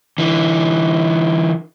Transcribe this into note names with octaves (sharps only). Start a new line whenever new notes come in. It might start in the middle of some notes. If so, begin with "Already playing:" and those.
D3 E3